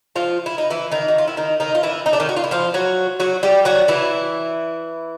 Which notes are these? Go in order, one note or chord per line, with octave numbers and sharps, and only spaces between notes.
F3 F4
E4
D#4
E3 E4
D#3 D#4
F#4
F4
E4
D#3 D#4
D#3 D#4
F4
E3 E4
D#4
D4
D#3 D#4
F#4
F4
E4
F3 F4
F#3 F#4
F#3 F#4
G3 G4
F#3 F#4
E3 E4